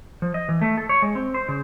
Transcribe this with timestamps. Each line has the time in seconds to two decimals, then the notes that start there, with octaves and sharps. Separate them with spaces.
0.22 F3
0.34 D#5
0.49 E3
0.61 A3
0.77 A4
0.89 C#5
1.02 G#3
1.15 C4
1.34 C5
1.49 C#3